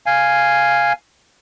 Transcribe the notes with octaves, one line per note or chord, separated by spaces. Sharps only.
F5 G#5